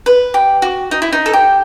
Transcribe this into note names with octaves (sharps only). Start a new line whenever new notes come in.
B4
G4
F#4
D#4
E4
D#4
A4
G4